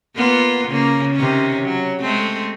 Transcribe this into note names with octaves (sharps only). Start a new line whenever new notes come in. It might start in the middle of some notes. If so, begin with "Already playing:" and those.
A#3 B3 F4
C#3 A#3
C3 D#3 C#4
F#3
G#3 A3 C4